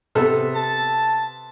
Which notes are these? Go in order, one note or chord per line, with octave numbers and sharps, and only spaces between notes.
C3 B3 A4
A5